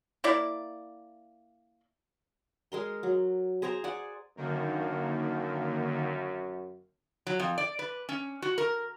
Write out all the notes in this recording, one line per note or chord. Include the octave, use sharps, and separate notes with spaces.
A#3 E4 D5
G#3 A#4 C6
F#3
G#4 C5 G#5 A#5
D5 F#5 G#5
F#2 D3 D#3 A#3
F#3
F2
D5
B4
C#4
F#4
A#4